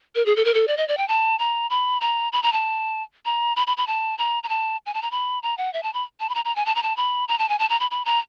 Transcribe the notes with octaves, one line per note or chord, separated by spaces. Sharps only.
A#4
G#4
A4
A#4
A4
D5
D#5
D5
G5
A5
A#5
B5
A#5
B5
A#5
A5
A#5
B5
B5
B5
A5
A#5
A#5
A5
G#5
A5
A#5
B5
A#5
F#5
E5
A5
B5
A5
B5
A#5
A#5
G#5
A5
A#5
A5
B5
A#5
A5
G#5
A5
A#5
B5
B5
A#5